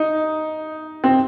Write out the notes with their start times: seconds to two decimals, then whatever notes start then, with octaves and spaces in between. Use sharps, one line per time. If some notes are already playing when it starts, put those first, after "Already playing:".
Already playing: D#4
1.04 C4